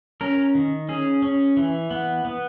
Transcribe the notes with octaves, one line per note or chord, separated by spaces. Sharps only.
C#4 A#4
D#3
C#4 G#4
C#4
E3
B3
B3